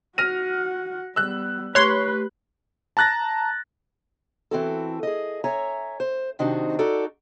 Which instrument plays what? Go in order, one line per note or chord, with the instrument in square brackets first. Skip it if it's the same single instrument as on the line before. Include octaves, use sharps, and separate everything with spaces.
[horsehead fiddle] F#4 F#5 [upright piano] F6 A#6 D#7
[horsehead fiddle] G3 B3 [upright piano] E6 F#6
[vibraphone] A3 G4 B5 [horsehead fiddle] B4 [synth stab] C#5 C6 [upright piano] F#6
[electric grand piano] A5 A#5 F#6 A6 A#6
[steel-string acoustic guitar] E3 C4 F#4 A4
G#4 D#5
C#5 E5 G#5 A#5
C5
C3 D#3 C4 D4 D#4 F#4
D#4 F#4 A4 D5